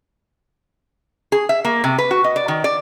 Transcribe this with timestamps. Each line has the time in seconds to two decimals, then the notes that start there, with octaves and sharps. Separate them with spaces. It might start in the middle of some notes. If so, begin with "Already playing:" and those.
1.32 G#4
1.49 E5
1.65 A#3
1.84 C3
1.98 B4
2.11 F#4
2.24 D#5
2.36 D5
2.48 D#3
2.64 D5